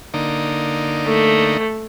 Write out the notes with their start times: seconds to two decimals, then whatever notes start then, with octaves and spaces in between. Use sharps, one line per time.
0.14 D3 A#3 D#4
1.06 A3